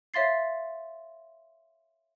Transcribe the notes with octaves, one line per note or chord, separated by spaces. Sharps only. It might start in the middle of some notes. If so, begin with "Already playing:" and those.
C#5 E5 F5 C6 A6 C7